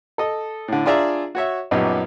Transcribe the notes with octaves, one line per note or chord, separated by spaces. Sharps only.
A4 D#5
A2 D3
D4 F4 G#4 D5 E5 A#5
F#4 C#5 E5
A#1 F#2 B3 C#4 D#4 G4